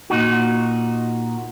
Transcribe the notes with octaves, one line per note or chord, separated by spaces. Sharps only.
A#2 D#4 F#4